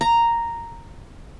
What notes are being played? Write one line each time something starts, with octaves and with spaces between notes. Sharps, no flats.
A#5